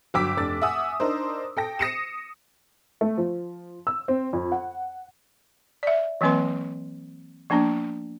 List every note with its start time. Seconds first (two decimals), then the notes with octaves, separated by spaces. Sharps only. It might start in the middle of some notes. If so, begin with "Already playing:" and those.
0.14 G1 F#3 G5 D6 E6 B6
0.37 F1 D4 A6
0.62 E5 F#5 G#5 D#6 E6
1.00 D4 D#4 A#4 C5
1.57 A4 G5 A#6
1.79 D#6 A#6 C7 C#7 D#7 E7
3.01 A3
3.18 F3
3.87 E6
4.08 C4
4.33 F2
4.52 F#5
5.83 D5 E5
6.21 E3 F#3 A#3 C4 B4 C6
7.50 F3 A#3 B3 D4